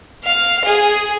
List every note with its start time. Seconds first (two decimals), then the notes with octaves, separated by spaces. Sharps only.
0.24 F5
0.64 G#4